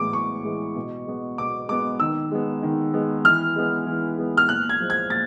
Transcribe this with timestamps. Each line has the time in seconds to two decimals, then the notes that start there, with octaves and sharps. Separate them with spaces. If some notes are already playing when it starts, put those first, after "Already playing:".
Already playing: A2 E3 G#3 B3 D6
0.13 A2 C#6
0.45 E3 G#3 B3
0.76 B2
1.07 G#3 B3
1.38 B2 D6
1.69 G#3 B3 D6
2.00 D#3 E6
2.32 G#3 B3
2.63 D#3
2.94 G#3 B3
3.24 E3 F6
3.56 G#3 B3
3.86 E3
4.18 G#3 B3
4.37 F6
4.48 A#2 F#6
4.69 G#6
4.80 F3 G#3
4.90 G#6
5.10 A#2 A6